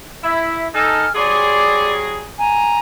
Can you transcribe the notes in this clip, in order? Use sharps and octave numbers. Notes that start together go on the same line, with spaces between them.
E4 E5
D#4 A4 G#5 F6
F#3 G3 G#4 D5 C6 D6
G#5 A#5